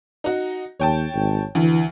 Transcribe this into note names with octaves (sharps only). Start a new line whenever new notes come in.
D#4 F#4
D#2 C#5 G5 A5
G#1
D2 E3